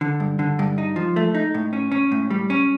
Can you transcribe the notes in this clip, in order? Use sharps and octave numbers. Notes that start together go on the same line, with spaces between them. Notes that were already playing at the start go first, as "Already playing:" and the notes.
D3
G2
D3
G2
D#4
F3
A3
D#4
A2
C#4
C#4
A2
G3
C#4